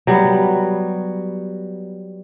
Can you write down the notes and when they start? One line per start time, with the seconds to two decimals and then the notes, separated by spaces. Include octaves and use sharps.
0.07 F#3 G3 B3